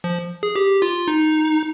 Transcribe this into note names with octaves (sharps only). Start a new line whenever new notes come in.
F3
G#4
G4
F4
D#4